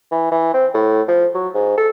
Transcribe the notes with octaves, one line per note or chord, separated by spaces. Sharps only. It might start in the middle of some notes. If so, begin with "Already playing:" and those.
E3
E3
C4
A2
F3
F#3
G#2
A4